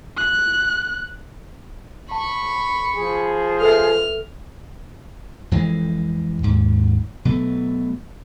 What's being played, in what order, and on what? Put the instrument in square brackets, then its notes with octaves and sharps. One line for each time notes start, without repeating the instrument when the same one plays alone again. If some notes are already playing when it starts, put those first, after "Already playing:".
[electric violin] F#6
[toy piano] A5 [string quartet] B5 C#6
[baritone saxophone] F3 [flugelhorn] G#4
[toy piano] A4 B4 E5 [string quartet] F6
[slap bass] F2 E3 G#3
D#2 G#2
B2 F#3 A3